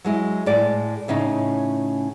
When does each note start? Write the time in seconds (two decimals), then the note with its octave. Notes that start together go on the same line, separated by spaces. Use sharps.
0.04 F#3 G#3 E4
0.46 A2 G#3 D5
1.08 A2 C#3 C#4 D#4